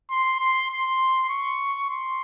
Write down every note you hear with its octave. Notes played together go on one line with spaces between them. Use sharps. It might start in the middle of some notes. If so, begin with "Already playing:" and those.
C6
C6
C6
C#6
C6